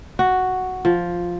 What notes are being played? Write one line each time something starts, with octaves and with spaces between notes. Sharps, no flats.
F#4
F3